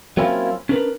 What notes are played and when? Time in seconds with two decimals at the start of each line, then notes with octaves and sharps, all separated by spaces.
0.17 F#3 A#3 C4 C#4 E4 F4
0.69 C#4 D4 F4 A#4 B4